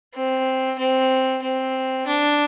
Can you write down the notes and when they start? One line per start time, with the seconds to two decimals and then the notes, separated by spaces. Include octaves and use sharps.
0.14 C4
0.78 C4
1.42 C4
2.07 D4